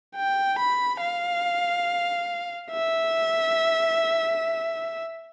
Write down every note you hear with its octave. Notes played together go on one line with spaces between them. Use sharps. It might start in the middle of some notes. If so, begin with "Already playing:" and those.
G5
B5
F5
E5